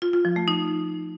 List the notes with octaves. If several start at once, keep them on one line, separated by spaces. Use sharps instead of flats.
F4
F4
F3
A3
D#4